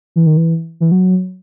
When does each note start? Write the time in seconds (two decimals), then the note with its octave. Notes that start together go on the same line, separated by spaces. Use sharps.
0.16 E3
0.26 D#3
0.37 E3
0.80 E3
0.91 F#3